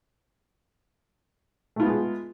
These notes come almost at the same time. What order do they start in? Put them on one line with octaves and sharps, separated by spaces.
A3 F4 B3 G#3